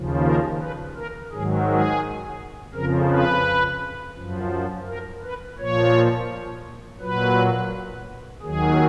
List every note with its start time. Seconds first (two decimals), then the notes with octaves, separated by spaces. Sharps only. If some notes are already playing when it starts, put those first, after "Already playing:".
Already playing: D#2 C#3 F3
0.25 A#4
0.61 B4
0.96 A#4
1.32 G#2 D#3 F#3 G#4
1.68 G#4
2.74 F2 C#3 F3 A#4
3.10 B4
4.16 F#2 F3
4.88 A#4
5.23 B4
5.58 A#2 F3 C#5
7.00 A#2 F#3 B4
8.42 D#2 D#3 F#3 G#4